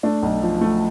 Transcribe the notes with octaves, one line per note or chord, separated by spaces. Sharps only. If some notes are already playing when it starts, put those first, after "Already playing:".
A3 D4
B1
F3
A3